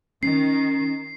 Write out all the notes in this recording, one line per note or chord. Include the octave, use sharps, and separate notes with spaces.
D#3 C#4 C7